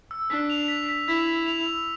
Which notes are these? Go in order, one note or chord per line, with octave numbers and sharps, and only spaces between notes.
E6
D4 B6
F7
B6
B6
E4 B6
B6
F7
E6